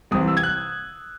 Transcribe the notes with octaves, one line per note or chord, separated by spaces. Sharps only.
C2 C3 E3 C4 D#6
E6
G#6
F#6